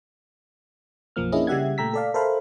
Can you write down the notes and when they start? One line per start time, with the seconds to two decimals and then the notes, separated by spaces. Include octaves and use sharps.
1.16 B1 F#2 F3 A#3 F6
1.32 A#3 C#4 D4 E4 G#4 D#5
1.47 C#3 G3 G4 E5 F#5 G#6
1.78 A#2 A3 G5 A#5 E6 B6
1.94 A4 D5 F5
2.14 A4 A#4 C5 E5 F5 B5